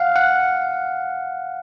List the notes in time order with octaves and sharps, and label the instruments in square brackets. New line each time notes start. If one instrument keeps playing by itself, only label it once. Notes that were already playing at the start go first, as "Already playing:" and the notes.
Already playing: [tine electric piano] F5 F#5
F#5